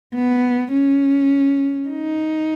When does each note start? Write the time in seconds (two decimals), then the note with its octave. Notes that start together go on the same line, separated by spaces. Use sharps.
0.15 B3
0.72 C#4
1.88 D#4